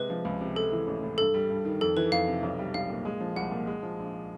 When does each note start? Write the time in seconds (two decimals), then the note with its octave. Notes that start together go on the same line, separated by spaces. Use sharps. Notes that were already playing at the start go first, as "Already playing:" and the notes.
Already playing: C3 G#3 B4
0.10 F3
0.25 C#2
0.41 C3
0.56 G#3 A4
0.72 E3
0.87 A1
1.03 A2
1.18 G2 A4
1.34 G3
1.50 G2
1.65 D#3
1.81 F2 A4
1.97 E3 B4
2.12 F2 F5
2.28 C3
2.43 B1
2.59 G3
2.74 B1 F5
2.90 A#2
3.05 G#3
3.21 F3
3.36 C2 F#5
3.52 A#2
3.67 G#3
3.83 F3
3.99 A#1